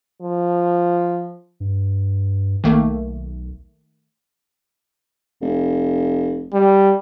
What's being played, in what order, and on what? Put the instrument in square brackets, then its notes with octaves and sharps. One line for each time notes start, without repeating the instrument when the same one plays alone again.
[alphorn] F3
[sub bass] G2
[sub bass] B1 [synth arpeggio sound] D#3 A3 A#3
[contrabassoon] F1
[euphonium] G3